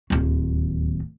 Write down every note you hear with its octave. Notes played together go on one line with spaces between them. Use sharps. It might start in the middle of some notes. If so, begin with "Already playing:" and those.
D1 D#2